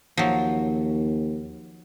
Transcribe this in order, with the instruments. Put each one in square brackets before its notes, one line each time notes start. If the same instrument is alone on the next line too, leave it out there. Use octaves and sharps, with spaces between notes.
[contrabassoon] D#2 [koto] F3 F#3